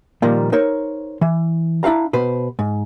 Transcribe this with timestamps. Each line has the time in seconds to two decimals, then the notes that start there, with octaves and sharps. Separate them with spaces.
0.22 A#2 D#3 F3 G3 A#3
0.52 D#4 A#4 C5 C#5
1.21 E3
1.83 D4 E4 F#4 F5 A#5
2.13 B2 B4 C5
2.59 G#2